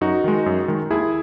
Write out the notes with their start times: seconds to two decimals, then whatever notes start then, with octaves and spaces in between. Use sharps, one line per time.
0.01 F#2 D#4 F#4
0.24 D#3 G#3
0.46 F#2
0.68 D#3 G#3
0.91 D#2 E4 G#4